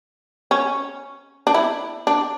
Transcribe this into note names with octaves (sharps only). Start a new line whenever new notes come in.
C#4
D4
E4
D4